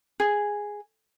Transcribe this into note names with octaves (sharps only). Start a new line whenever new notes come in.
G#4